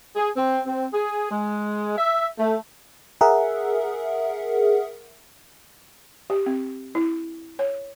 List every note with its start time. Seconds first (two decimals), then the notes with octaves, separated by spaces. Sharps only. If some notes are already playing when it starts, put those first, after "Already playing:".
0.16 G#4
0.37 C4
0.65 C4
0.93 G#4
1.30 G#3
1.97 E5
2.38 A3
3.21 G#4 A#4 E5 F#5
6.30 G4
6.46 C4
6.95 E4
7.59 C#5